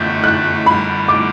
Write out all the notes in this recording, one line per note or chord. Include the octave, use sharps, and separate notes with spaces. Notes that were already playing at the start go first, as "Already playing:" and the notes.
Already playing: F#2 D3 A3 G6
F#6
F#2 D3 G3 B5
D6